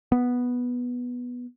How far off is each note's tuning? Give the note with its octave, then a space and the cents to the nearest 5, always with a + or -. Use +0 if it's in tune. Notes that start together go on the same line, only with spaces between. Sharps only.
B3 -5